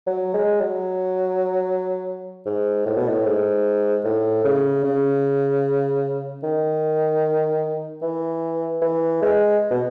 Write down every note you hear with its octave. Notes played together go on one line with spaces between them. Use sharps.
F#3
G#3
F#3
G#2
A2
B2
A2
G#2
A2
C#3
C#3
D#3
E3
E3
G#3
B2